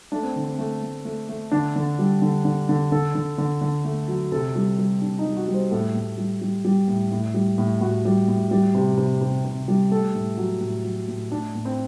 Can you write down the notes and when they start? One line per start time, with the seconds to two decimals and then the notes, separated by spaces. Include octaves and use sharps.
0.12 A3 D4
0.23 C4
0.36 D3
0.44 C4
0.59 A3
0.83 A3
1.05 A3
1.29 A3
1.51 D3 D4
1.76 D3
1.99 G3
2.22 D3
2.45 D3
2.69 D3
2.92 D3 A4
3.15 D3
3.38 D3
3.61 D3
3.85 A3
4.08 F#3
4.32 C3 A4
4.56 G3
4.78 G3
5.01 C3 D4
5.19 D#4
5.26 G3
5.37 F#4
5.48 G3
5.54 C5
5.71 A2 A4
5.94 A2
6.18 G3
6.41 G3
6.65 G3
6.88 A2
7.11 A2
7.34 G3
7.58 A2
7.81 A2 F#4
8.05 G3
8.28 A2
8.51 G3
8.75 C3
8.98 C3
9.21 C3
9.45 C3
9.68 G3
9.91 A3 A4
10.15 A2
10.37 F#3
10.60 A2
10.85 F#3
11.08 A2
11.30 A2 D4
11.55 A2
11.65 C4